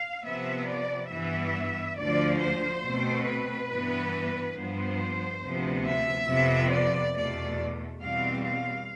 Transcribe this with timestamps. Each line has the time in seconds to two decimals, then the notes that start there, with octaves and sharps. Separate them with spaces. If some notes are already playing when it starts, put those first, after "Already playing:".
Already playing: F5
0.24 C3 F3 B3 E5
0.68 D5
1.10 G2 E3 B3 E5
1.97 D2 D3 F3 D5
2.39 C5
2.84 B2 A3 C4
3.26 B4
3.69 G2 E3 B3
4.56 G2 F3 B3 C5
5.42 D2 C3 F3 B3
5.85 E5
6.28 F2 C3 F3 B3
6.71 D5
7.14 E2 B2 A3 D5
8.00 E2 B2 G3 C4 F5
8.43 F5